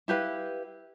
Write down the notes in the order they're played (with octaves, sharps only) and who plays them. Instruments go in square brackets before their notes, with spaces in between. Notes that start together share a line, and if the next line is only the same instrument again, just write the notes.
[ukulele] E4 G4 B4 F5